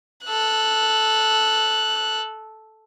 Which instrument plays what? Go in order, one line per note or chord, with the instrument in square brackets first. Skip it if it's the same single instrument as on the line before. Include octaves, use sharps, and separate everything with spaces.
[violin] A4 F#6